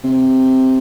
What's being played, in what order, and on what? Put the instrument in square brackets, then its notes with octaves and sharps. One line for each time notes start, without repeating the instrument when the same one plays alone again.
[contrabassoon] C3